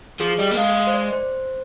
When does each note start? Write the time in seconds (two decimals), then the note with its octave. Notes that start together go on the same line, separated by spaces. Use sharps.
0.20 F3 G#4
0.39 G3 D#5
0.51 A#3
0.57 G#3 F5
0.76 D#5
0.87 C5
0.94 D5
1.13 C5